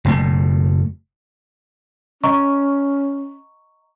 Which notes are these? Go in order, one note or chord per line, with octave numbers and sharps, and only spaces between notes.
F#1 B2 A3
C#4 D#5 A#5 C#6